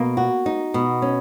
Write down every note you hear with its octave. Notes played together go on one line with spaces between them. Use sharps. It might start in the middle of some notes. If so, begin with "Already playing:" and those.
Already playing: B2 A#3
F#4
D#4
B2
C#4